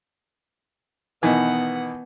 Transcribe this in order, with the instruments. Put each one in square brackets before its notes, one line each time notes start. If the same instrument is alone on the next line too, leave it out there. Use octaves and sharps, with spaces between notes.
[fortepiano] B2 D#3 E3 [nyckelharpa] B3 F#5